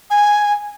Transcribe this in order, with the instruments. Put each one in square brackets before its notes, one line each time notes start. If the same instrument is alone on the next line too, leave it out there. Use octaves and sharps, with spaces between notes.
[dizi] G#5